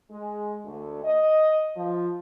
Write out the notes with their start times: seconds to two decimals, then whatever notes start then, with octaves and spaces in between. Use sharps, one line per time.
0.11 G#3
0.64 D2
1.03 D#5
1.76 F3